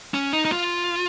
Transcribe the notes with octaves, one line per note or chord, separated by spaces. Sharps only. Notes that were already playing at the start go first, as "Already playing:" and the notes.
C#4
D#4
D#4
F4